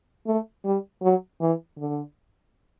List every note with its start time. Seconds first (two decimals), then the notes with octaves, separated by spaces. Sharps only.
0.27 A3
0.65 G3
1.02 F#3
1.41 E3
1.78 D3